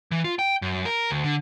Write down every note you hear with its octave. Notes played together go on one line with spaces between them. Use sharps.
E3
F4
G5
F#2
A#4
D2
D3